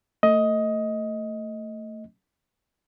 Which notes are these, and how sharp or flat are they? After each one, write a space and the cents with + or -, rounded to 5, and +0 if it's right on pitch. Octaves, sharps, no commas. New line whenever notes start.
A3 +25 D#5 +15